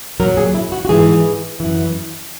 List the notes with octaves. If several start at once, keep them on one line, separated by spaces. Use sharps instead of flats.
A#2 F#3 A#4
G#4
E4
F#4
F#4
G#2 E3 G#4
F#2 E3